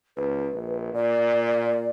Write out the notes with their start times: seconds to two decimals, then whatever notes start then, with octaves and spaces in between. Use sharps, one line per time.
0.17 C#2 B4
0.53 A#1
0.94 A#2 D5